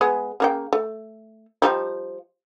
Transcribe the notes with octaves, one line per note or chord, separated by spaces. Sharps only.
G#3 B3 G#4
C#3 A#3 G5
A3
F3 G3 D#4